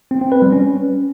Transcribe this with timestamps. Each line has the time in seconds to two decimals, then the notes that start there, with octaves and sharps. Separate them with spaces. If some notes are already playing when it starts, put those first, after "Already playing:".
0.11 C4
0.21 C4
0.32 B4
0.42 G3
0.52 C#4